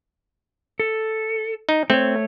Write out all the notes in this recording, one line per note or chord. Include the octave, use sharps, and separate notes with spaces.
A4
D#4
A3 C4 C#5